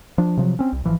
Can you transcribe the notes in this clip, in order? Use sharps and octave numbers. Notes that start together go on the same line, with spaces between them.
F3 D4
C3 F3 F#3
C4 C#4
C2
G#1 E3 F3